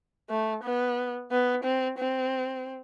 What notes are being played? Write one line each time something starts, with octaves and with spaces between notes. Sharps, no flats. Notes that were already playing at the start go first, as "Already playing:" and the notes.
A3
B3
B3
C4
C4